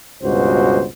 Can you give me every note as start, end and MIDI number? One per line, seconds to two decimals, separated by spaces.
0.23 0.86 37
0.23 0.86 43
0.23 0.86 47
0.23 0.86 66
0.23 0.86 72